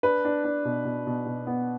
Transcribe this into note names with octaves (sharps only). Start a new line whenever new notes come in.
D4 B4
D4
D4
B2
B2
B2
B2
B3